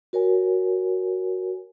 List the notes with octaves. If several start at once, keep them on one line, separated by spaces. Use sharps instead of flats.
F#4 A#4 C#5 G#5